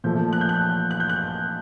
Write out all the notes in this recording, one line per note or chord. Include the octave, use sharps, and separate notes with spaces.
A#2 F3 A3 G6
F#6
G6
F#6
F#6
F#6
G6
F#6